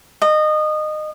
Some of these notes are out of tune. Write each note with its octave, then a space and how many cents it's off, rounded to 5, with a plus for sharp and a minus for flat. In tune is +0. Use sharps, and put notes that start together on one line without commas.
D#5 -25